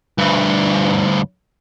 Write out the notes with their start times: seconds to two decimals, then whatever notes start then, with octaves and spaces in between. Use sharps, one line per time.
0.19 D2 G2